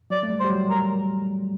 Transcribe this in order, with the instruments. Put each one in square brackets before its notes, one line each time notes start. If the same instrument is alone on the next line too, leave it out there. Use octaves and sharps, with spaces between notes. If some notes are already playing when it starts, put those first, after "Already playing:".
[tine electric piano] F#3 [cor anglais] D5
[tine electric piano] A3
G3
[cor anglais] C5
[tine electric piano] G3
F#3
[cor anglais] A#4